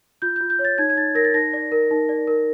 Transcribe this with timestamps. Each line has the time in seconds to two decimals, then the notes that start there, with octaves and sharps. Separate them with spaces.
0.22 F4 G6
0.36 F4 G6
0.50 G6
0.59 C#5
0.65 A6
0.78 D#4 G#6
0.90 G#6
0.97 D#4 A6
1.15 A#4 A#6
1.25 A6
1.34 D#4 A#6
1.53 D5
1.72 A#4
1.91 D#4
2.09 D5
2.27 A#4